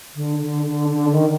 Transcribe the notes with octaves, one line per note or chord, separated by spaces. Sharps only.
D3
D3
D3
D3
D#3